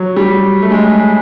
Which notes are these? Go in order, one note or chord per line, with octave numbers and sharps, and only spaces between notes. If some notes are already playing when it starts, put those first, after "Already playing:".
Already playing: F#3
G3
A3
G#3